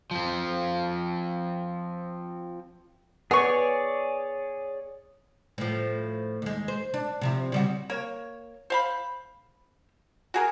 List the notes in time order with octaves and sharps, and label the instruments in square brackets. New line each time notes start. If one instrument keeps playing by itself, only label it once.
[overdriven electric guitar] F3 C4
[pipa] B3 C#6 [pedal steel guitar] G#4 C#5 D5
[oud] A2 F3
D#2 G#3
C5
D4
C3 F3 E4
C#3 G3 F#4
[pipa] A#3 C#5
C5 F5 B5
F#4 G#4 A#4